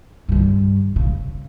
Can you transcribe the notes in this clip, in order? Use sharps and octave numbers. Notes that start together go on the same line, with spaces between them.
G2 D3
C#3